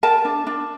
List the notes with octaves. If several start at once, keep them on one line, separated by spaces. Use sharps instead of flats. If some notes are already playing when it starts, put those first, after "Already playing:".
A#4 A5
D4
D4